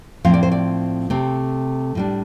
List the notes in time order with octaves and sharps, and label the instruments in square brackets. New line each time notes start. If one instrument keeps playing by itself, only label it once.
[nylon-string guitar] A2 F3 C4 F5
D5
C5
D5
C3 A3 C4
A2 G3 D4